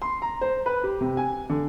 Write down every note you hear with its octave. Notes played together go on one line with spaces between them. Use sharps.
C6
A#5
C5
B4
G4
C3
G#5
D3